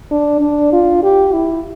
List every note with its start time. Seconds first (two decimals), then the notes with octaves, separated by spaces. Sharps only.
0.11 D4
0.41 D4
0.72 F4
1.03 G4
1.33 E4